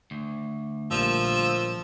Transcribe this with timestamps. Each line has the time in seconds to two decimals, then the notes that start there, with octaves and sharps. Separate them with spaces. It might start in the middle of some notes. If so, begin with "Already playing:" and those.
0.11 D2
0.91 A#1 F3 G3 A#3 E6